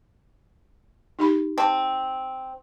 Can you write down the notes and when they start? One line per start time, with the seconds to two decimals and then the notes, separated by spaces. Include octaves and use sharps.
1.19 D#4 G4 B5
1.58 C4 A5